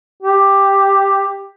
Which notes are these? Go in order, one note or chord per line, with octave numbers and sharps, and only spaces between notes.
G4